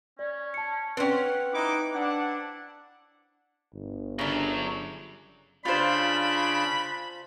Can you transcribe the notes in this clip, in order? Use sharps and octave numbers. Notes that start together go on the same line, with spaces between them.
C#4 D5
A5 C#7
C4 C#4 B4 F#5 G5
D#4 E4 D6
D4 E4 F#5
G1
F#2 C#3 F#3 D4
C#3 D4 F4 C5 B5